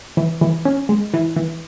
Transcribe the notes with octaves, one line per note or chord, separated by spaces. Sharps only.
E3
E3
C#4
G#3
E3
E3